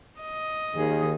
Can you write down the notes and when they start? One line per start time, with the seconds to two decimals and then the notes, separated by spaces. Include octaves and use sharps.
0.20 D#5
0.76 D#2 D#3 G#4